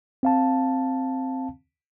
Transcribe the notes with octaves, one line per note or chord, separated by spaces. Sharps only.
C4 F5 A5